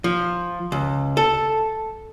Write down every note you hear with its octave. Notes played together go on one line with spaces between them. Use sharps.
F3
C#2
A4